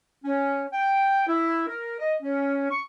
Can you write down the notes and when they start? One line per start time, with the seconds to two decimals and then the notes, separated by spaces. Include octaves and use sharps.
0.24 C#4
0.72 G5
1.28 E4
1.67 A#4
1.99 D#5
2.21 C#4
2.71 C#6